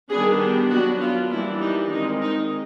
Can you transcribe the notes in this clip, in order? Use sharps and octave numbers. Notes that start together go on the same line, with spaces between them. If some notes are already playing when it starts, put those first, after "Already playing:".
D#3 G3 B3 D4 G#4
G4
F#3 B3 D4 F#4
F4
E3 G3 A#3 D4 E4
D#4
D#3 G#3 C4 D#4
D#4